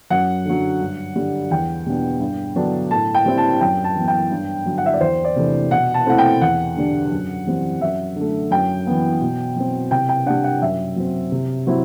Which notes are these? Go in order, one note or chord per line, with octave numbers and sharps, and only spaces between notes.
F#2 F#5
D3 F#3
G2
D3 G3
E2 G5
B2 G3 B3 D4
G2
D3 F#3 B3 D4
A2 A5
G5
G3 C4 E4
A5
F#2 G5
A5
E3 B3
G5
G2
D3 F#3
F#5
E5
D5
E2 C5
D5
C3 E3 A3 D4
B2 F#5
A5
A3 C4 E4 F#5
G5
E2 F#5
D3 G3 D4
F#2
E3 G3 C4
F#2 E5
D3 A3
F#2 G5
E3 B3
B2
F#3 C4
C3 G5
G5
G3 D4 F#5
F#5
F#2 E5
F#3 C4
C3
F#3 C4 E4